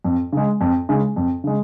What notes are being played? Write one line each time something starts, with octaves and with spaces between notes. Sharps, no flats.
F2
C#3 G#3
F2
C#3 G#3
F2
C#3 G#3